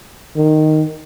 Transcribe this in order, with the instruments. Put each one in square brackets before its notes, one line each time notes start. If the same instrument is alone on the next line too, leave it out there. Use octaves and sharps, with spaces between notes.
[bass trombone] D#3